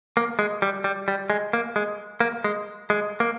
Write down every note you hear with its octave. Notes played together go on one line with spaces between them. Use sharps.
A#3
G#3
G3
G3
G3
G#3
A#3
G#3
A#3
G#3
G#3
A#3